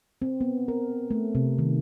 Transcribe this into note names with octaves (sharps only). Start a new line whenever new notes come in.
C4
B3
A#4
A3
C3
D#3